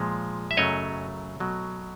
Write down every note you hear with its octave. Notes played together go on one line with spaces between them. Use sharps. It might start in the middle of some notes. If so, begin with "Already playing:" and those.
Already playing: A#2 F3 G#3
E5
F#2 C#3 F#3 A3 C#5 D#5
B2 F#3 A3